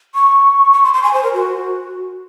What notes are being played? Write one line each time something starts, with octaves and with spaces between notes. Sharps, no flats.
C#6
C#6
C6
C6
G#5
C5
A#4
F#4